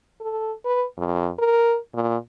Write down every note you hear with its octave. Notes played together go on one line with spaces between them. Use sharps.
A4
B4
F2
A#4
A#2